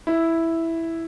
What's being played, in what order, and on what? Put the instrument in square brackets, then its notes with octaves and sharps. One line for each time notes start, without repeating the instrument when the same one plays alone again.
[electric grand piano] E4